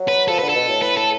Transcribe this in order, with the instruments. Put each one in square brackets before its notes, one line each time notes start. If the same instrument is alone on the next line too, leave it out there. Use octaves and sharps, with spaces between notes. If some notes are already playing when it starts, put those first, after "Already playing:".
Already playing: [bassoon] F#3
[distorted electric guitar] B4
[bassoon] F3 [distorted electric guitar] A4
[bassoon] D3 [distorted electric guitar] B4
[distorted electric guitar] A4
[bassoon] B2
A2
[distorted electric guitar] B4
A4